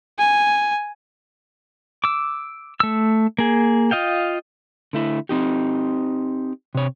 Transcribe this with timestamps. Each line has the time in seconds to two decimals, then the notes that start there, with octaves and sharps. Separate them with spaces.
0.18 G#5
2.04 D6 E6
2.80 A3 E6
3.38 A#3 G#4
3.91 F4 D#5 F5 G5
4.93 D3 A3 E4
5.29 C4 D#4 G4
6.75 C3 C#5